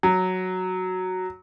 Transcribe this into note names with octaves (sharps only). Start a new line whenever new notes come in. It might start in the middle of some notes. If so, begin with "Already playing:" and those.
F#3